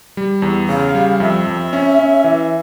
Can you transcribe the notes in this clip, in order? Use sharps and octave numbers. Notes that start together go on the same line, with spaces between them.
G3
E2
C#3 F5
G3
F2 E5
F2
C#4
C#4
E3